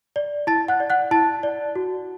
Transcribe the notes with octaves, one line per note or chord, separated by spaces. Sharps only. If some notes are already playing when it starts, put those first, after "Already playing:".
D5
E4 A5 A6
F#5 F#6
D5
F#5 F#6
E4 A5 A6
D5
F#4